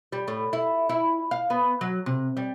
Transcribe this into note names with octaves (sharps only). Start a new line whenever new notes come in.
G3
A2
E4
E4
F5
B3
F#3
C3
G3